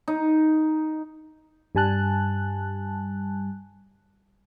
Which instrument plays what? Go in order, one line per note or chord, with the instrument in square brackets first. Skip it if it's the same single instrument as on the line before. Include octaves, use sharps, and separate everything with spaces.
[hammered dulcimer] D#4
[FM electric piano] G2 G3 G#5 A5 F#6